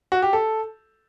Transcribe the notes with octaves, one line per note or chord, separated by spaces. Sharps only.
F#4
G4
A4